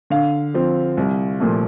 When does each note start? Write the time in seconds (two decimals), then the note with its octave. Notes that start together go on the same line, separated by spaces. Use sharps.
0.10 D3 F5
0.54 F3 C4
0.97 C2
1.40 A#2 F3 A3